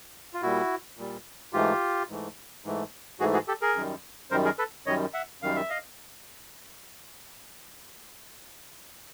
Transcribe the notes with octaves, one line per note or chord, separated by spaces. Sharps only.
F4
A#2 G3 E4 F#4
A#2 G3
G#2 E3 A3 F4 G4
G#2 E3 A3
G#2 E3 A3
G#2 E3 A3 F#4 G#4
F#4 G#4
G4 A4
G#4 A#4
F#2 D#3 G3
F#2 D#3 G3 A#4 C5
G#4 A#4
A4 B4
F#2 D#3 G3 C#5 D#5
E5 F#5
F#2 D#3 G3 F5
E5
D#5 F5